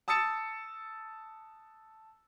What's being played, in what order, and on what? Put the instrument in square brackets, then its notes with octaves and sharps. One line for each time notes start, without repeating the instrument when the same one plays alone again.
[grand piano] A5 D#6 E6 A6 C#7 E7